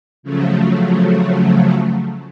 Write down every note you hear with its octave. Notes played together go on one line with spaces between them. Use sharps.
C#3 F3 F#3 A3